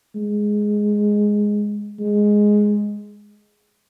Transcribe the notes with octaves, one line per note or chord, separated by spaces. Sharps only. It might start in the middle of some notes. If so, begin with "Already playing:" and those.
G#3
G#3